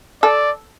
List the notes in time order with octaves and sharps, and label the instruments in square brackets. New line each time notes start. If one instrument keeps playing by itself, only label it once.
[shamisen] A4 [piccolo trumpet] D5